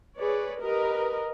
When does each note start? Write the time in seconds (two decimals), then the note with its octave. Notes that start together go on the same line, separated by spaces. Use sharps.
0.18 G#4 B4 C#5 D5
0.61 G4 A#4 B4 D#5